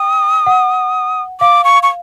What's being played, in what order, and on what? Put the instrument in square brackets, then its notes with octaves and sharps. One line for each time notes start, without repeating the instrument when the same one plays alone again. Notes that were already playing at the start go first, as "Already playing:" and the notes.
Already playing: [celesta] G5 [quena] D#6
[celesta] F#5
[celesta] F5 [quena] D6
[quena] C#6
C#6